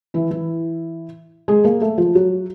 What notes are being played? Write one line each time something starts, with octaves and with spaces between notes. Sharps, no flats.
E3 E4
E3 E4
G#3 G#4
A#3 A#4
A3 A4
F3 F4
F#3 F#4